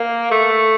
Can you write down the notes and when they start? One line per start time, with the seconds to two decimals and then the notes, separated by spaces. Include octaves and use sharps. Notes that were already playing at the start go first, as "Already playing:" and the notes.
Already playing: A#3
0.31 A3